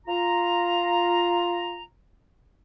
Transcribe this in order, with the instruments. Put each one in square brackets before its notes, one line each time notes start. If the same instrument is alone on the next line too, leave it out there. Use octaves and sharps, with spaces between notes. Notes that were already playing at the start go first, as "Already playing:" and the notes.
[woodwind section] F4 A#5